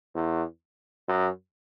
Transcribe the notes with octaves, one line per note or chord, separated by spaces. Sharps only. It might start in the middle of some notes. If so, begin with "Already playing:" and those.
E2
F#2